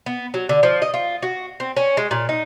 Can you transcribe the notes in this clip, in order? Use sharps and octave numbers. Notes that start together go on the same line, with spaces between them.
B3
F#3
D3
F3
D#5
F4
F#4
C4
C#4
G#3
A#2
D#4